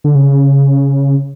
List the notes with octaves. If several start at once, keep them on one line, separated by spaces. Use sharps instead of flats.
D3
C#3